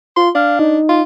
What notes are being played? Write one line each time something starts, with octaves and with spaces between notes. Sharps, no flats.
F4 C6
D4 F5
D#4
F4